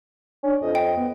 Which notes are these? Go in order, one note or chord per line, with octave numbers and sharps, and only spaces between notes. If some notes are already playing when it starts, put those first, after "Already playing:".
C#4 D4
F2 D#5
G5
B3